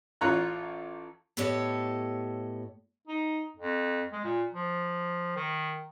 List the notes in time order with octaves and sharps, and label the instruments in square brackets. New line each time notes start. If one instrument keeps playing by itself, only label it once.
[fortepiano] A1 F4 C#5 A#5 F#6
[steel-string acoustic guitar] A2 B3 G4 A4 C#5 D#5
[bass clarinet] D#4
F2
G#3
A#2
F3
D#3